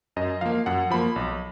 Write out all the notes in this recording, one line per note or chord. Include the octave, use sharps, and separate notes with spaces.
F#2 D#5
F3 A#3 F5
F#2 F#5
F3 A#3 B5
B1